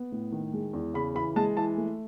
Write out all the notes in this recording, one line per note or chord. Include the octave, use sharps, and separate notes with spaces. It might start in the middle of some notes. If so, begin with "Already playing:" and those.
Already playing: B3
A2
D#3
G#3
E2
C#3 B5
E3 B5
G#3 A5
E3 A5
A3